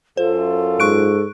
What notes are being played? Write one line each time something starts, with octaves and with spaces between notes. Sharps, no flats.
F#2 F4 A4 C5
G#2 C#6 F#6 D7